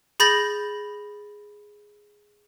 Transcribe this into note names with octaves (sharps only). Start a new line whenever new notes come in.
G#4 B5 G6 A6 A#6 F#7